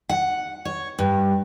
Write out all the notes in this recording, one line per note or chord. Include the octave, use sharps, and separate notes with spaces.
F#5
C#5
G2